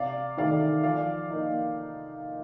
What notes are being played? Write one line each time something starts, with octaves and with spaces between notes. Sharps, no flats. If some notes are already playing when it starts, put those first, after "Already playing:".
Already playing: C3 D5 F5
D#3 A3 D5 F5
F3 D5 F5
A#3 D#4